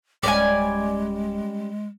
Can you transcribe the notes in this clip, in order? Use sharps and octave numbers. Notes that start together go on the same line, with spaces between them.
D1 G3 G#3 C#4 D5 G#5